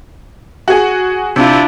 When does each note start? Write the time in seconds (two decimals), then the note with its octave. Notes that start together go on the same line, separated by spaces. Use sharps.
0.68 F#4 G#4
1.36 C3 D4 E4 F4